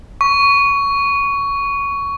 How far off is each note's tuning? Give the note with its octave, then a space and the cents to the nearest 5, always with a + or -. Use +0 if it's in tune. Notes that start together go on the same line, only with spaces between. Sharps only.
C#6 +15